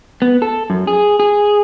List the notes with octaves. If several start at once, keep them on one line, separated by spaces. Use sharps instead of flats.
B3
A4
F#2
G#4
G#4